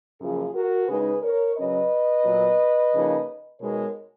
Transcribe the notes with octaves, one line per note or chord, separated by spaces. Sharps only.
F#2 C#3 F3 A#3 F4 G#4
F#4 A#4
C#3 G#3 D#4 G#4 B4
A#4 C#5
C#3 F#3 C#4 B4 D#5
A#2 F#3 B3
C#3 F3 A#3 D#4
B2 G#3 B3 D#4 A#4 C#5